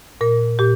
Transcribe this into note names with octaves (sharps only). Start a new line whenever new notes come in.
A#2 A#4
A#2 G4